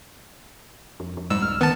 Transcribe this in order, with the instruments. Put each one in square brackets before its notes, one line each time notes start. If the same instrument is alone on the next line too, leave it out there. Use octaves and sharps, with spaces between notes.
[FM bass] F2
F2
[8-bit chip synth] G#2 E6 [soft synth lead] G3
[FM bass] C2 [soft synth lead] F6
[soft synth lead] D#3 [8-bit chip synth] B3 A5